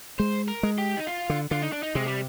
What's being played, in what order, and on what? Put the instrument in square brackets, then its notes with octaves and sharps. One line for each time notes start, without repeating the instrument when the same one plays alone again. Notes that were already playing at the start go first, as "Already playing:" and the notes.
[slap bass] G#3 [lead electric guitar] C5
[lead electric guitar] A#4
[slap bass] G#3
[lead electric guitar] G4
D#4
F4
[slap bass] D3
[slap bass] D3 [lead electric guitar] F4
[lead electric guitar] D#4
D4
D#4
[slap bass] C3 [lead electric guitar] G#3
[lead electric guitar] G3